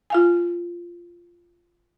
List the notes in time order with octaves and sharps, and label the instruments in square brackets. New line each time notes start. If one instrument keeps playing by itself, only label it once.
[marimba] F4 F5 G#5